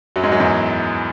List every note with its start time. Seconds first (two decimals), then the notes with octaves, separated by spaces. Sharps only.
0.16 F#2 F#3
0.23 G#2 G#3
0.32 F#2 F#3
0.40 E2 E3